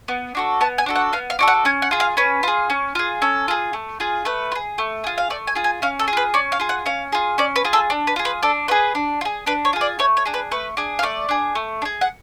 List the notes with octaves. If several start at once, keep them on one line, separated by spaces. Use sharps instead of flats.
B3
D4 F#4 A4
B3 A5
G#5
D4 F#4 A4
F#5
B3 F5
F5
D4 F#4 A4
F#5
C#4 G#5
F#5
F4 G#4
F5
C#4 B4
F4 G#4
C#4
F4 G#4
C#4 A4
F4 G#4
A3
F4 G#4
A3 B4
F4
G#4
A3
F4 G#4
F5
A3 D5
G#5
F4 G#4
G#5
C#4 F5
A4
G#4
F4 B4
C#4 D5
F5
F4 G#4
F#5
C#4 F5
F4 G#4
C#4 D5
B4
F4 G#4
A4
D4
B4
F4 G#4
B4
D4 A4
F4 G#4 B4
D4
F4
G#4
D4 B4
C#5
F4 G#4
D5
A3 C#5
C#5
D4 G#4
B4
A3 B4
D4 G#4
F5
A3 D5
D4 G#4
A3
D4
G#4
F#5